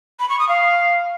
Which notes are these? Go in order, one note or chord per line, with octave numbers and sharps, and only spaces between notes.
B5
C#6
D#6
F5